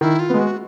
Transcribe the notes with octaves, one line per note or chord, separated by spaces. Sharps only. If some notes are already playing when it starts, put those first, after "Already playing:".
D#3 E4
F4
G#3 B3
F#4